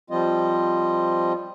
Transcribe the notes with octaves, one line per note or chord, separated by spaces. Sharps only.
F3 G3 C4 F4 D#5